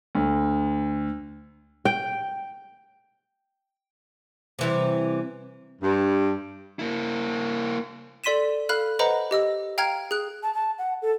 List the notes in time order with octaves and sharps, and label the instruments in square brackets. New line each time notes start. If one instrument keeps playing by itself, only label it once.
[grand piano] D2
[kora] G5
[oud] C3 E3 G3
[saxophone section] G2
[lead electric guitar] A#3 E4
[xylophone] A4 D5 C6 B6 D#7 E7
A4 F5 B5 F6 F#6
B4 C5 D#5 F#5 A#5 B5
G4 D#5 E6
F5 G5 A#5 F6 G#6
G#4 F#6
[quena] A5
A5
F#5
A4